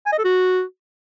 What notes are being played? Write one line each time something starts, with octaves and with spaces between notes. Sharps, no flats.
G#5
D#5
A4
F#4